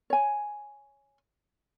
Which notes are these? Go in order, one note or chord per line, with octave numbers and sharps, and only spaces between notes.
C#5 G#5